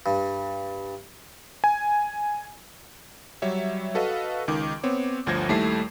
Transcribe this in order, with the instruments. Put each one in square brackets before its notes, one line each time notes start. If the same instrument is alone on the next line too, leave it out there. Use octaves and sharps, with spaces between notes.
[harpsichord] G2
[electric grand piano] G#5
F#3 G3 C#5 E5
F#4 A4 B4 D#5 F5
C#2 D#3 D6
B3 C4 C#5
G1 D2 F3 C5 G#6 A#6
D#2 G3 A3 E4 A5 C7